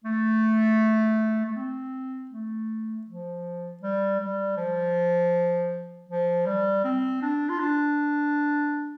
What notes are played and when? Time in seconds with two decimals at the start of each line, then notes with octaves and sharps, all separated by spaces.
0.04 A3
1.45 A3
1.56 C4
2.31 A3
3.07 F3
3.82 G3
4.20 G3
4.57 F3
6.09 F3
6.46 G3
6.84 C4
7.22 D4
7.49 F4
7.60 D4